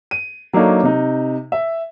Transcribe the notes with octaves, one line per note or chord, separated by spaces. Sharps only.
D#7
F#3 A#3 D4 D#4 A4 C#5
C3 D#4
E5